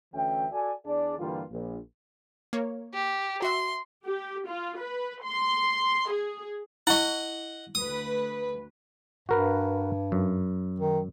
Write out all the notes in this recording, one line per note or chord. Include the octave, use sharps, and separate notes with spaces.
D2 E3 C#4 E5 G5
F#4 A4 D5 G#5
E2 D4 G#4 D5
G2 D3 E3 G3 A#3 F4
A#1
A#3 C#5
G4
F#4 E5 C6
G4
F4
B4
C6
G#4
E4 D#5 F#5 C#6
D2 B4 D#6
G2 F#4 A#4 B4
F#2
D#3